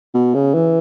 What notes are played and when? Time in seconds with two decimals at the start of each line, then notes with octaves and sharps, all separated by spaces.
0.14 B2
0.34 C#3
0.54 E3